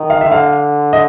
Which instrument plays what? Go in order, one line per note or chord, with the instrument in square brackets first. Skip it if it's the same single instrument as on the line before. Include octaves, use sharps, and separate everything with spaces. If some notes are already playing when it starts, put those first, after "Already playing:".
Already playing: [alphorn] D#3
[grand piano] F5
E5
[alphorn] D3 [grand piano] F5
[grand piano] D#5